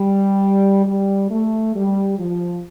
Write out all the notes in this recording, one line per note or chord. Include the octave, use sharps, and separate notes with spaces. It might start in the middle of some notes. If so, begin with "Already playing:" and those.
Already playing: G3
G3
A3
G3
F3